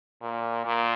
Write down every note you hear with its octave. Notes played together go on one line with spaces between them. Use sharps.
A#2
A#2